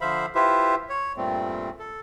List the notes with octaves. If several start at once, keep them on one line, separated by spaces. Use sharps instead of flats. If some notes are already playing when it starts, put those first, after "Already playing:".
D3 F3 C5 E5 F5 B5
E4 F4 G4 B4 C5 E5
C#5
G2 A#2 G3 A3 C4
A4